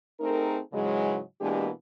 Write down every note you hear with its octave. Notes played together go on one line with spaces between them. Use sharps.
A3 C4 D#4 G#4 A#4
G#2 C#3 E3 F#3 G#3
B2 E3 G#3 A#3 D4 G4